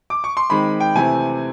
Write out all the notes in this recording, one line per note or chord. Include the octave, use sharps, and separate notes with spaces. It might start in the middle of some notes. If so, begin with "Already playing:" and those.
D6
C#6
C6
D#3 G#3 C4 B5
G5
C3 E3 A3 C4 G#5